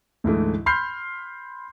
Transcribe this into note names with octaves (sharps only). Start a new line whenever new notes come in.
D2 G#2 E3 A3
B5 C6 F6 G6 C7